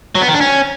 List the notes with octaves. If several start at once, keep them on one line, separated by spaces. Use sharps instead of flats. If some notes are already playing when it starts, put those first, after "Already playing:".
F#3
B3
D#3
D4
C#4